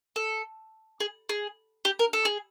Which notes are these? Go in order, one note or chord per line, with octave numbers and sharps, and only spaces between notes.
A4
G#4
G#4
G4
A#4
A4
G#4